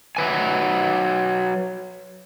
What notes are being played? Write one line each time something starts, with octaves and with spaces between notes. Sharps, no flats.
F#3 B4 G#5